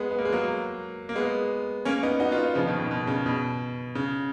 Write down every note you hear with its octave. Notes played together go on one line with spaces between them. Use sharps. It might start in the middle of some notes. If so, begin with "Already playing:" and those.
Already playing: G#3 B3
B3
A#3
G#3
F#3 A#3
A#3
G#3 B3
A#3 C#4
B3 D#4
D#4 F#4
F4
B3 D#4
C#3 F3
B2 D#3
B2
B2
C#3
B2
C#3